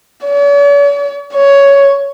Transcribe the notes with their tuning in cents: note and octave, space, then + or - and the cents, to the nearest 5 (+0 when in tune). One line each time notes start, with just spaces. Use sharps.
C#5 +45
C#5 +10